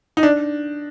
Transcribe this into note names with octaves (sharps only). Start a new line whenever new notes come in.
D#4
D4